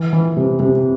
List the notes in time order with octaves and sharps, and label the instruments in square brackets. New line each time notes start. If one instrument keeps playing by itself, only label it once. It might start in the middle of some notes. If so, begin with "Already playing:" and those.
Already playing: [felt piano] E3
E3
C3
C3